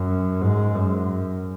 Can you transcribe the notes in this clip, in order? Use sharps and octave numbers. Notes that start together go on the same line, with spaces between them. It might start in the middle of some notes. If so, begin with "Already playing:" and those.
Already playing: F#2
G#2
F#2